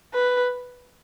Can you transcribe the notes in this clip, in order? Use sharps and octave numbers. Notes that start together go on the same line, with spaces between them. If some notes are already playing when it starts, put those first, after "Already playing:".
B4